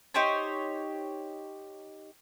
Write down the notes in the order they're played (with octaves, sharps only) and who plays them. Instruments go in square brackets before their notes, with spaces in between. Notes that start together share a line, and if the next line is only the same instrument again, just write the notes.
[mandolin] D#4 G4 C5 C#5